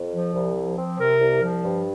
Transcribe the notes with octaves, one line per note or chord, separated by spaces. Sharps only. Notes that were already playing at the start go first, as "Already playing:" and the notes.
Already playing: F2
F3
C2
F3
C4
C3 A#4
C2
F3
G2